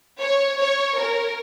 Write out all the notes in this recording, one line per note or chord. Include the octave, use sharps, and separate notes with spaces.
C#5
C#5
A#4